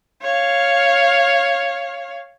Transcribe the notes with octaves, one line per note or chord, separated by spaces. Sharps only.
C#5 F5